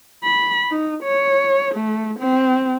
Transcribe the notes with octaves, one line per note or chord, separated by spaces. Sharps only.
B5
D#4
C#5
A3
C4